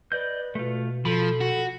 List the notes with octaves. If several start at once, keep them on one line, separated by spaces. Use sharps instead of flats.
B4 D5 D#5 G6
B2 A3 F4
F3 A4 B5
F#4